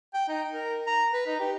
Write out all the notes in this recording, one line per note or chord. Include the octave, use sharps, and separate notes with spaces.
G5
D#4
A#4
A#5
B4
D#4
G4